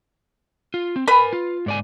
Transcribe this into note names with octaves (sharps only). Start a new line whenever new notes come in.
F4
C4
A#4 B4 G#5 B5
F4
G#2 D5 G#5